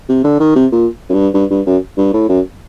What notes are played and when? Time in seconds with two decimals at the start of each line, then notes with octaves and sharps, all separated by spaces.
0.09 C3
0.24 D3
0.40 D#3
0.55 C3
0.72 A#2
1.09 F#2
1.14 G2
1.34 G2
1.51 G2
1.66 F#2
1.97 G2
2.13 A2
2.29 F#2